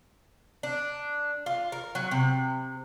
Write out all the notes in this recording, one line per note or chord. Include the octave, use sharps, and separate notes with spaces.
D4
F4
A#4
F#3
C3